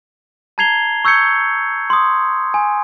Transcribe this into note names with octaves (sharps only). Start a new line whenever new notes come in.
A5 A#5 G#6 C7 F7 G7
C#6 E6 G6 G#6 C#7
C6 D#6
G#5